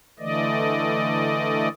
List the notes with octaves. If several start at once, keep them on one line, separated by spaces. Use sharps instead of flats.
D3 E3 A3 D5 D#5